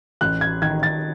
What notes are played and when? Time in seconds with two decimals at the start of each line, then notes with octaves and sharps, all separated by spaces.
0.21 A1 F#6
0.41 G#6
0.62 D#3 G#6
0.83 A6